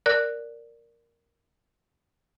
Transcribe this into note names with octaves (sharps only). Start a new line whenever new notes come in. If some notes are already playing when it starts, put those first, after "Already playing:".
A#4 D5 F#6